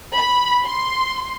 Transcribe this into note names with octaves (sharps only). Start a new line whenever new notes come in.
B5
C6